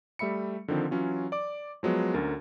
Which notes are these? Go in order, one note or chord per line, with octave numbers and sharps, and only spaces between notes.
G3 A3 E5 B5 C#7
D3 D#3 F3 C4
E3 F#3 C#4 F4
D5 D6
F3 F#3 G#3 B3
D2 D3 C#4 A#4 A6